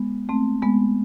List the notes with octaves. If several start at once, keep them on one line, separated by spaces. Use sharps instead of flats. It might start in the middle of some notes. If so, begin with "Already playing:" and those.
Already playing: G#3 B3
A3 C4
G#3 B3